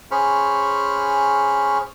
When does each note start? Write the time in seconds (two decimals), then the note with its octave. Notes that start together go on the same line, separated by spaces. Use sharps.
0.11 C#4 G#4 C5 B5 C#6 F6